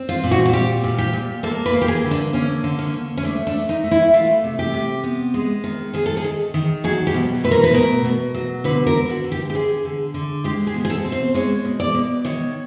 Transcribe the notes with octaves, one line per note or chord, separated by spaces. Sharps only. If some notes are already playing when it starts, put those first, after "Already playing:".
Already playing: C4
F4
A#2
F#4
F#4
G3 G4
A#2
G4
A#2
A#3 A4
B4
A#3
G4
G#4
D3
D4
A#3 C#4
D3
C#4
D3
C#4
A3 D4
D4
A3
D#4
A3
E4
A3 F4
C3
G4
C3
B3
G#3
D#3
D#3 G#4
A4
G#4
D#3
D#3
F#3 G#4
G4
B2
A3 B4
A#4
B4
B2 A#4
B2
F#3
D3 B4
A#4
D3
F#4
D3
G4
G4
D3 G#4
D3
D3
G#3 G4
G#4
B2
G#4
A4
C4
C5
G#3 C#5
B2
D5
B2
D#3 C#5